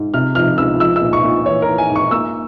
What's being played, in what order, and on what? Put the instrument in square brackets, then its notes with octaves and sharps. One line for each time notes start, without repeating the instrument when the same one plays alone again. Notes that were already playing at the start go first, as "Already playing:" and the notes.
Already playing: [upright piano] G#2
C3 F6
F3 F6
C#2 E6
F3 E6
E6
A#2
C#6
A#2
E3 C#5
A#4
E3
G#5
G#2
C#6
A#3 E6